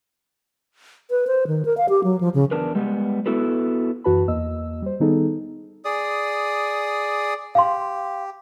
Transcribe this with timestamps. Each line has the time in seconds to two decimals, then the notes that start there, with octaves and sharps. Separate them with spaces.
1.11 B4
1.27 C5
1.47 D#3
1.65 A#4
1.77 F5
1.89 G4
2.04 F#3
2.21 F3
2.34 C#3
2.51 E2 D4 A#4 B4
2.75 G3 G#3 B3
3.26 B3 E4 F#4 A4 B4
4.04 F#2 E3 F#4 B4 A5 B5
4.28 E2 A#3 D#5 E6
4.82 G3 C5
5.00 D#3 G3 B3 D#4 G#4 A4
5.85 G#4 D5 D#6
7.55 G4 F5 C6